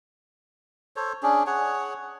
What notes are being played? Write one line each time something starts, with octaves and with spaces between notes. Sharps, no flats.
A4 C5 C#5
C#4 D4 G#4
G#4 C#5 F#5